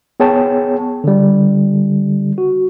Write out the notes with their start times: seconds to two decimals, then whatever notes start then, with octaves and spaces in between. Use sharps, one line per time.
0.20 B3 G#4 C#5 G5 A5
1.04 D3 G3
2.38 F#4